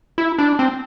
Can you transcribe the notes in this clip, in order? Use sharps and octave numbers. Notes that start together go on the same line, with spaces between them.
E4
D4
C4